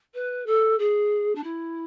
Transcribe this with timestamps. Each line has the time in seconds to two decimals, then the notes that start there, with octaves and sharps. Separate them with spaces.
0.14 B4
0.46 A4
0.78 G#4
1.35 D4
1.43 E4